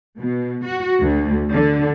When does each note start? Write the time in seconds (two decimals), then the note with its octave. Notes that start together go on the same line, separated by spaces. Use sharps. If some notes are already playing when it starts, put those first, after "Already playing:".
0.18 B2
0.65 F#4
1.00 D2
1.52 D3